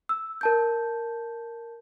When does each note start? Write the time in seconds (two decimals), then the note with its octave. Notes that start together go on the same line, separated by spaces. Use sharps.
0.09 E6
0.41 A#4 A5 G6